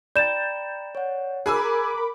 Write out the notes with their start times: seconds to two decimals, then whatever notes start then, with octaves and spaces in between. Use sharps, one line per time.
0.16 D5 G5 A#5 B5 G6 A6 E7
0.95 C#5 F#5
1.46 G#4 A#4 G#5 B5 D6 E6 F#6